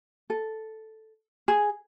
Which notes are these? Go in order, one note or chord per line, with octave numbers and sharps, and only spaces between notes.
A4
G#4